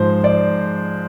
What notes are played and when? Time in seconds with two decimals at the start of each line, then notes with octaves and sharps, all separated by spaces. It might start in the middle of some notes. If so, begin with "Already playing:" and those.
Already playing: G#2 F3 C5
0.24 D5